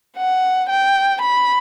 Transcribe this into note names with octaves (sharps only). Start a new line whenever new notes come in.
F#5
G5
B5